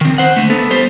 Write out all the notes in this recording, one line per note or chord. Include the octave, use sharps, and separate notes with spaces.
D#3 C4
C5 F#5
D3 A3
B3 A4
G3 C5